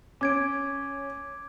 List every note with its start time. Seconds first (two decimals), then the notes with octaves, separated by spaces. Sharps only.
0.21 C#4 D6 G#6 D7